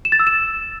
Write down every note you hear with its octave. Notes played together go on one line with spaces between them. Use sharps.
E7
A6
E6
E7